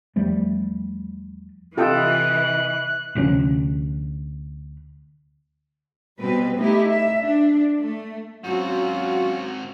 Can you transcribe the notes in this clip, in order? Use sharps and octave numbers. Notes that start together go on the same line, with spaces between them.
E2 F3 G3 A3
C3 E3 F4 A4 D#5 G5 F#6
D2 C3 F3 C#4
B2 G3 C4 B4
A3 D#4 E4 G4
E5
D4
A3
G#2 F#3 C4 C#4 F4 F#4